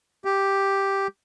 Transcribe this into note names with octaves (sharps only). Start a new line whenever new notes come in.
G4